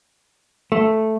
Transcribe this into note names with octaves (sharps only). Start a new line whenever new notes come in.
A3